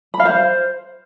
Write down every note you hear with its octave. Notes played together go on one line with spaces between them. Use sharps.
B5
F5
C5